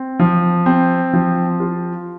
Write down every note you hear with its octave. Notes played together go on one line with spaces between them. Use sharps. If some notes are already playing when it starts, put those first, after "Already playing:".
Already playing: C4
F3
C4
F3
F4